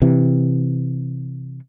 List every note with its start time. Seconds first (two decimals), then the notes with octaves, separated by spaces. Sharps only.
0.02 C3 E3